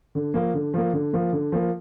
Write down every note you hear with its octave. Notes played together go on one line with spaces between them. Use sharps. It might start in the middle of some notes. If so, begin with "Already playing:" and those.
D3
F3 A#3
D3
F3 A#3
D3
F3 A#3
D3
F3 A#3